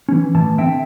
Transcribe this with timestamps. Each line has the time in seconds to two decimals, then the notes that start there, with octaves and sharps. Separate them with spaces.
0.09 E3 C#4
0.35 A2 E3 A5
0.58 D3 C4 E5 G5